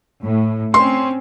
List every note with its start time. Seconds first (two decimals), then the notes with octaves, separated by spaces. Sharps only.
0.22 A2
0.74 C4 C#4 C6